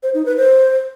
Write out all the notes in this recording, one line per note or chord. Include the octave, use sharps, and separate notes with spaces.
C5
D#4
B4
C5